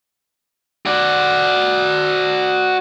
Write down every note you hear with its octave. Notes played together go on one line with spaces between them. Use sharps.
F#4 D5